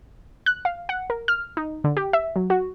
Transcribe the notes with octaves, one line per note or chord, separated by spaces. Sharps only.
F#6
F5
F#5
A#4
F6
D#4
D3
G4
E5
F#3
F#4